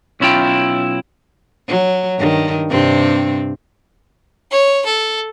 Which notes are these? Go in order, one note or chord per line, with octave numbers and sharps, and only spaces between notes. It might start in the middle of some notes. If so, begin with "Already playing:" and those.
B1 C#4 E4 F4 G5
F#3
G2 D#3
G2 C3 C4
C#5
A4